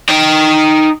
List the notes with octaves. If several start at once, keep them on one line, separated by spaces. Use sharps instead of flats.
D#4 G5